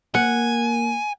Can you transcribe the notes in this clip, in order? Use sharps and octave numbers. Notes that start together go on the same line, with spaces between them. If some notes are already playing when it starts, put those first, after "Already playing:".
A#3 F#5 G#5